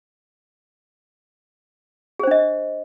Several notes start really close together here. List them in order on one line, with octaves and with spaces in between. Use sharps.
G#4 C5 D4 D#5